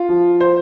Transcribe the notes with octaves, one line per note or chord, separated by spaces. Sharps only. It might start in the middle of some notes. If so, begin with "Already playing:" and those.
Already playing: F4
F3
C5